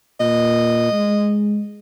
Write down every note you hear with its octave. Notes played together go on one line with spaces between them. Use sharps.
A#2 D#5
G#3